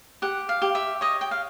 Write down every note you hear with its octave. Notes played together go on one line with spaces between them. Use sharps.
G4 F#5
F5
G4
E5
C#5 D#5
G5
F5